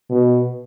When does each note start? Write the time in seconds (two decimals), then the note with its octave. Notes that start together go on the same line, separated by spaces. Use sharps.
0.10 B2